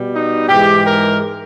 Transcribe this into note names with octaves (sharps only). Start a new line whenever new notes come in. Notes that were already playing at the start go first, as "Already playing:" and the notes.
Already playing: B2 G3
D#4
G#2 E3 G#3 G4
A#4